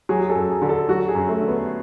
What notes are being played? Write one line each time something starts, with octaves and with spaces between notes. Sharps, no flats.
F#3 G#4
G#4
A4
F#2
G#4
D3
A4
F#3 F#4
G#4
F#2
A3
D3
B3